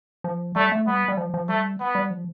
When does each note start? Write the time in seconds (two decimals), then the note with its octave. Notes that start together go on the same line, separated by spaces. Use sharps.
0.24 F3
0.56 G3 A3
0.72 A3
0.87 G3 B3
1.08 G3
1.17 F3
1.34 F3
1.49 G3 A3
1.80 B3
1.95 G3
2.11 F3